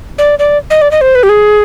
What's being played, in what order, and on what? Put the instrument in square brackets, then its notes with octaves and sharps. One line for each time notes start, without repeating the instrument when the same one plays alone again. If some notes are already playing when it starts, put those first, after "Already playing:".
[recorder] D5
D5
D#5
D5
D#5
C5
B4
G4
G#4